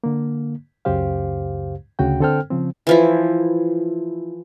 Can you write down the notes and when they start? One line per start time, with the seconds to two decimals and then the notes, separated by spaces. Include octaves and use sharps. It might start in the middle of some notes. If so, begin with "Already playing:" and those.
0.04 D3 A#3
0.85 C#2 F#2 C#3 G4 C5 F5
1.99 D2 C#3 F#4 G5
2.21 D3 C4 A4 C5 G5 F6
2.50 C#3 F3 C4
2.87 E3 F3 E4